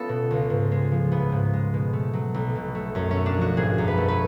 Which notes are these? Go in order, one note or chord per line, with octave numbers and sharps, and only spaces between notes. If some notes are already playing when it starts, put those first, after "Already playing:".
Already playing: A3 B3 C#4 F4 A4
B2
C#2
G#2
G#3
F3
A1 B3
G#2
G#3
B2
A3
F#3
B1
B2
A3
F#2 C#4
C#4
A3
D4
F3 F#4
G#1 G#4
F#2
B4
A3
B4